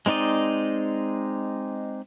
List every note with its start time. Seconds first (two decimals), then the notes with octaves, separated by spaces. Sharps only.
0.06 G#3 C4 D#4 D5 D#5